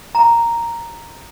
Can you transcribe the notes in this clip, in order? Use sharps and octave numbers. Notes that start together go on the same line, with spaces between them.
A#5